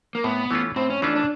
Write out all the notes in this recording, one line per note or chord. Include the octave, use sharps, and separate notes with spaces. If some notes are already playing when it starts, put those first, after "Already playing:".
A#3
A2 B3
E3 A3 C#4 F4
A2 C4
C#4
E3 A3 C#4 D4 F4
D4